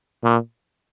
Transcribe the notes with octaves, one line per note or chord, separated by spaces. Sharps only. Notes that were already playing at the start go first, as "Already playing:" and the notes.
A#2